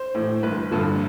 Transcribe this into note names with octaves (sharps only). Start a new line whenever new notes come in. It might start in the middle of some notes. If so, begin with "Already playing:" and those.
Already playing: C5
A2 E3
G1 B4
G2 D3 F3